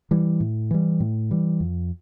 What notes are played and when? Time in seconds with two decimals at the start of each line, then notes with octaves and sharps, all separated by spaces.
0.11 E3 G3
0.40 A2
0.71 E3 G3
1.00 A2
1.31 E3 G3
1.60 F2